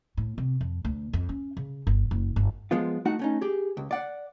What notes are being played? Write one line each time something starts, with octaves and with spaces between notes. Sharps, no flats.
A2
C3
F2
D2
F2
C#4
C#3
G1
F#1
G1
F3 G#3 B3 F4
A3 D#4 F#4 F#5
A3 C#4 D#4
G4 G#4
C#2
D5 F#5